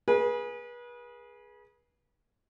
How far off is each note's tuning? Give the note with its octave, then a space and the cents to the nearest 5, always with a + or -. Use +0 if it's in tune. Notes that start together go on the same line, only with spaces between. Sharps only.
G#4 +0 B4 -35